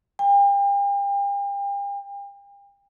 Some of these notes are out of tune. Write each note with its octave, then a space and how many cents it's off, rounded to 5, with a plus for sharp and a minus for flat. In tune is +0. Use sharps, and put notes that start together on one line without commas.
G5 +40